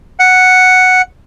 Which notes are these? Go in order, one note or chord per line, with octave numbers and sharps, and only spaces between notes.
F#5